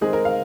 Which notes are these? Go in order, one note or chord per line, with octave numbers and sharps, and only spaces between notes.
D#3 G#3 C4 G#4
A#4
F5